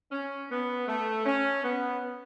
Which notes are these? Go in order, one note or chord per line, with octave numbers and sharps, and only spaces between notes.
C#4
B3
A3
C#4
B3